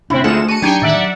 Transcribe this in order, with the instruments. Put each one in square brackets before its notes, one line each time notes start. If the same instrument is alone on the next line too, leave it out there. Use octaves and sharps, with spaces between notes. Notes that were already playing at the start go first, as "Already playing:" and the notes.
[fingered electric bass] D2 C3 D4 [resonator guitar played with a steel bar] A2 [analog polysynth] C4 E4
[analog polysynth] D2 G#3 E7 [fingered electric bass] A3 [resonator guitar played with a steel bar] F4 A4 F#5
[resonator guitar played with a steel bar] F#4 A5 [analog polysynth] C#7 D#7
[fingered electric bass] F#3 [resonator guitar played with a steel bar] D4 D#4 G4 [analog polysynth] G5 G#5 C#7
[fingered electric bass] A2 D#3 [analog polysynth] D5 E5 F#5
[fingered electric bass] F#3